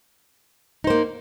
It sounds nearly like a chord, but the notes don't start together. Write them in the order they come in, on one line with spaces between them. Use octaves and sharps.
D#4 C5 A#3